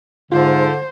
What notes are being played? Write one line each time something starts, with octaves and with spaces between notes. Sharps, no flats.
G#2 D3 F4 C5